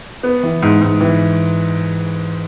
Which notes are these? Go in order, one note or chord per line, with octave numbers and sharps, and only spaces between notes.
B3
E3
G#2
G#2
E3